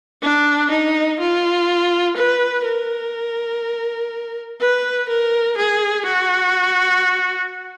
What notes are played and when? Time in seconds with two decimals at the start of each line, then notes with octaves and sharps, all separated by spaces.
0.22 D4
0.70 D#4
1.20 F4
2.16 B4
2.66 A#4
4.60 B4
5.08 A#4
5.57 G#4
6.05 F#4